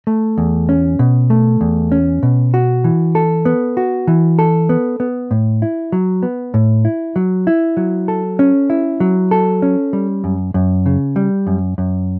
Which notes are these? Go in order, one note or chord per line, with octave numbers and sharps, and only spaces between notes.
A3
E2
C#4
B2
A3
E2
C#4
B2
F#4
E3
A4
B3
F#4
E3
A4
B3
B3
A2
E4
F#3
B3
A2
E4
F#3
E4
F#3
A4
C#4
E4
F#3
A4
C#4
G3
F#2
F#2
C#3
G3
F#2
F#2